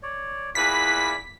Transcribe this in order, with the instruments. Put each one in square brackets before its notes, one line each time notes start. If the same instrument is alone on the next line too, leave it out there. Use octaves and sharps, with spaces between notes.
[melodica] C#5 D5
[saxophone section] E2 A#2 B4 [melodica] E4 D5 [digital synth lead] B6